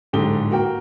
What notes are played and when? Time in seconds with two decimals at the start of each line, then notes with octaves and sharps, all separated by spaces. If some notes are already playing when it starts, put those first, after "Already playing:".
0.13 D1 G#2 D3 G4 G7
0.51 A#3 F#4 A#4 G5